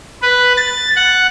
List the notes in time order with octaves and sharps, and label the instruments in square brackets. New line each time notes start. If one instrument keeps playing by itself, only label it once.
[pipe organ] B4
A6
F#5